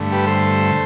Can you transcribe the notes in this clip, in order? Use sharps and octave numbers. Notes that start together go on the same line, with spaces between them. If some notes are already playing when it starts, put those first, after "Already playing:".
Already playing: G2 D3 A3
G4 B4
A4 C5